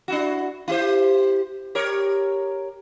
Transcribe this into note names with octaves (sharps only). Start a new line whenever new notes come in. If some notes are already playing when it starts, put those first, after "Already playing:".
D4 E4 F#4
E4 G4 C5
G4 A#4 C#5